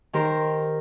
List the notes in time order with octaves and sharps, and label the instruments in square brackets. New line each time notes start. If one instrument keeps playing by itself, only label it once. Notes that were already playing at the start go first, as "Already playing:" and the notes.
[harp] D#3 G4 A#4 C5